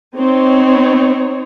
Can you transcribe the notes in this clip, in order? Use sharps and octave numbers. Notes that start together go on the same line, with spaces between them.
C4 D#4 C#5